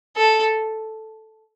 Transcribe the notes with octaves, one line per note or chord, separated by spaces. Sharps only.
A4